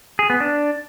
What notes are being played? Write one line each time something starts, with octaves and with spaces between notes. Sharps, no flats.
G#4
B3
D4